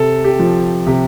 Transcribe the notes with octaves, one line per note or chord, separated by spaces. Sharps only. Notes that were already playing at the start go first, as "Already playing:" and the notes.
Already playing: C3 A4
G4
F3
C3 G4